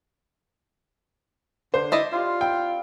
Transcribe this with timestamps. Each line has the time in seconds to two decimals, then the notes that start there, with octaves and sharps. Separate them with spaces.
1.74 D3 D4 C5 D#6
1.92 E4 D5 D#5
2.12 F4 G4 F5 C6
2.41 C4 B4 G5